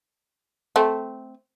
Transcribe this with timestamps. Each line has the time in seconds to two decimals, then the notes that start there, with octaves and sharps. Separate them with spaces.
0.76 A3 C4